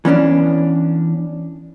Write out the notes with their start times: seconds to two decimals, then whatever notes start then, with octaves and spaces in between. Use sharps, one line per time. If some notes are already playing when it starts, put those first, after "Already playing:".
0.05 E3 B3 C#4 D4